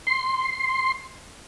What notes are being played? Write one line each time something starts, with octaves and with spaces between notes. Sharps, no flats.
C6